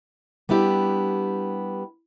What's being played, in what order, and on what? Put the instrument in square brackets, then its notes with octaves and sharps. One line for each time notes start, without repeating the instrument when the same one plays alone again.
[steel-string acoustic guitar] G3 B3 D4 E4 G4